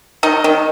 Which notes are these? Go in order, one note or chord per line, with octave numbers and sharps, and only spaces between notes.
D#3 D#4 D#5
D#3